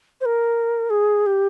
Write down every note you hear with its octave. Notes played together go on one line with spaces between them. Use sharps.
C5
A#4
G#4
G4